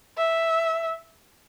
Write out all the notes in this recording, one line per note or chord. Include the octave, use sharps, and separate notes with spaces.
E5